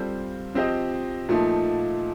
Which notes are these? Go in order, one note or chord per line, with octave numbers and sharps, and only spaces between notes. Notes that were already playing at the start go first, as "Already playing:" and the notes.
Already playing: G3 C4 F4 A4 C5
F3 C4 G4 C5 D#5
A#2 F3 A3 D#4